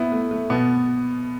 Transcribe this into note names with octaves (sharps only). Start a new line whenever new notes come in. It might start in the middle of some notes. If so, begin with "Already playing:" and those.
Already playing: B3 E4
A3
A3
B2 B3